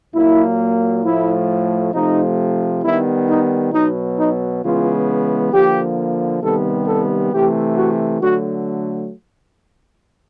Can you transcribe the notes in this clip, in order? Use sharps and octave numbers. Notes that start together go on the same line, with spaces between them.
A#2 F#3 A#3 E4
A2 F3 A3 E4
C3 F3 A3 D#4
D#3 G3 B3 E4
D#4
B2 F#3 B3 D#4
D#4
C#3 E3 G#3 B3 F4
D3 F3 A#3 G4
C3 D#3 G3 B3 A4
A4
C3 E3 A3 G4
F#4
D3 F#3 A3 F#4